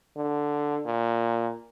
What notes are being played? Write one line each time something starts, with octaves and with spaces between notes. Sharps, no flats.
D3
A#2